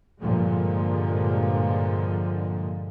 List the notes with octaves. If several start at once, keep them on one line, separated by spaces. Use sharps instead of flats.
G2 A#2 D3 F3 G#3